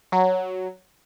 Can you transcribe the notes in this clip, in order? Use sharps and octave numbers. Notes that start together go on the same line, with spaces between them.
F#3